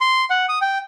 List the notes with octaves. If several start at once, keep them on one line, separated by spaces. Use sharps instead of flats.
C6
F#5
D#6
G5